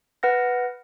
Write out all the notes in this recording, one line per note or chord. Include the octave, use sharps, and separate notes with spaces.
B4 F#5 F6 A#6